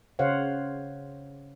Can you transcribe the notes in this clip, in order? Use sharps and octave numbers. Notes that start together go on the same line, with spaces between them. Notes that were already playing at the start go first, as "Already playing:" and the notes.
C#3 C5 C#5 F5 F#5